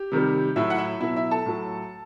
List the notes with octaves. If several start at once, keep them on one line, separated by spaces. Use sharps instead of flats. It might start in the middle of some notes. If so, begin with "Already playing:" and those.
Already playing: G4
C3 D#3 G3
A2 F#3 E4 E5
F#5
E4 E5
B2 F#3 E4 E5
E4 E5
A4 A5
A2 F#3